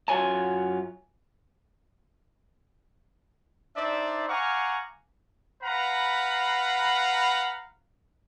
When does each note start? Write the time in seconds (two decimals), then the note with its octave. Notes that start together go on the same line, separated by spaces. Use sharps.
0.08 F#2 F4 F#4 C#5 G#5 A5
3.76 D4 D#4 C5 D5 E5
4.29 F5 F#5 G#5 A#5 C#6 D6
5.63 B4 F5 F#5 A#5 B5